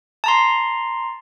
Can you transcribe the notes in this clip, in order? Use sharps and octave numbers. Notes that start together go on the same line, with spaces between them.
A5 A#5 C6